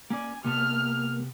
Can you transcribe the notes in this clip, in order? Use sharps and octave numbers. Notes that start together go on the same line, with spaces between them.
A#3 C#4 D5 G#5
C3 A#3 B3 A5 F6